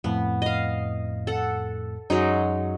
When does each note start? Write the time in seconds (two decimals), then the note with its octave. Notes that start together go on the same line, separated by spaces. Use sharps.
0.04 F2 A2 B3
0.42 D#5 F5
1.27 A4 F#5
2.10 F#2 F#3 G#3 D#4